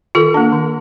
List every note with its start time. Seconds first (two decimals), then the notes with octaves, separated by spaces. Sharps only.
0.15 D#3 F4 A4
0.34 A#3 D4
0.52 D#3